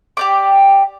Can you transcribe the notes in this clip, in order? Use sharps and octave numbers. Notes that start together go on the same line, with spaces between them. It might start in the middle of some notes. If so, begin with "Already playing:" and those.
G4 D5 D6